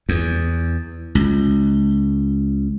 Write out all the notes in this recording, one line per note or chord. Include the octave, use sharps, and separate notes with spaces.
E2
C#2